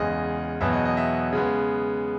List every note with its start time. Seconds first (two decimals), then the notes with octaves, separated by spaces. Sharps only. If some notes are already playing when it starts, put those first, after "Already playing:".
Already playing: E2 C#3 G#3 D#5
0.61 E2 B2 F#3 B3 E5
0.73 D#5
0.85 D#5
0.97 E5
1.33 C#3 G#3 B3